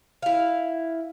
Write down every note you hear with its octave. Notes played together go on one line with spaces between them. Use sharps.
E4 F5